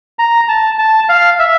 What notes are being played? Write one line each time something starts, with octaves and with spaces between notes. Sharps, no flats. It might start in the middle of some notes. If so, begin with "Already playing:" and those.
A#5
A5
A5
F5
E5